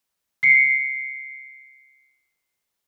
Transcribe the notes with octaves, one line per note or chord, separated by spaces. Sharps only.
C7 C#7